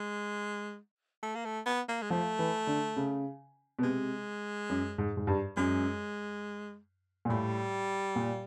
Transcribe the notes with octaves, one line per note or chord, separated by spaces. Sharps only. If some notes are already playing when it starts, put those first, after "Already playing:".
Already playing: G#3
A3
A#3
A3
B3
A#3
G#3
F3 A3
E3
D3
C#3
B2
C3 G#3
F#2
G#2
G#2
G2
F#2 G#3
A#2
A2 G3
A#2